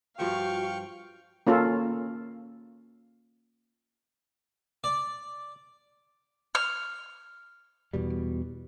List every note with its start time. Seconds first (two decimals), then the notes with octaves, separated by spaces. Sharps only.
0.19 G2 F3 F#4 E5 F5 G5 C#6
1.47 A#3 C#4 F4 A4
4.84 D5
6.55 F6
7.93 E2 B2 G3